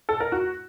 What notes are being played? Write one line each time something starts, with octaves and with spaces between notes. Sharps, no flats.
A4
A#4
F#4